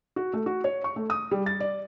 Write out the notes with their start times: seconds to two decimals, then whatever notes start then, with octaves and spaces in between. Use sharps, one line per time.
0.16 F#4
0.33 A3
0.46 F#4
0.64 C#5
0.84 C#6
0.96 A3
1.10 D#6
1.31 G3
1.46 A6
1.60 D5